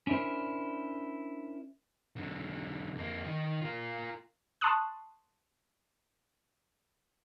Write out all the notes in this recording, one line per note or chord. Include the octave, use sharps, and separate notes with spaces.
C#4 D4 E4 A#4 C5
B1 D3
F2 A#3
D#3 D#4
F4 A#4
A5 C6 C#6 D#6 F#6